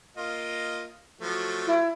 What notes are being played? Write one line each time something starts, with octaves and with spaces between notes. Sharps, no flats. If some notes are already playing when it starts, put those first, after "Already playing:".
A#3 F4 D#5
F3 F#3 A3
E4